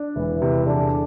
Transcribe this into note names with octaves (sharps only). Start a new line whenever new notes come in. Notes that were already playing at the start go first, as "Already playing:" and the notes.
Already playing: D4
E1 E3 E4
C3
E2 D3 D4